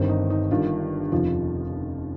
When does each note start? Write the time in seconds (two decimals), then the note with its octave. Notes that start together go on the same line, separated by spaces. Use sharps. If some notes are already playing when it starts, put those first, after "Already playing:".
Already playing: G1 G2 D#3 C4
0.09 D#4
0.30 D#4
0.51 G1 G2 D#3 F4
1.12 F1 D#2 C#3 F3 F4